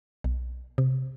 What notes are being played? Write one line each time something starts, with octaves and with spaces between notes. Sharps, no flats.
B1
C3